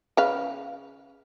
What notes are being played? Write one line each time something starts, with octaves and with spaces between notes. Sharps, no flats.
C#3 B4 F5